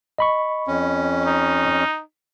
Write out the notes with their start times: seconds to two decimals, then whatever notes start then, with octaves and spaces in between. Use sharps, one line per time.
0.18 D#5 B5 C#6
0.68 F2 C#4
1.26 D#4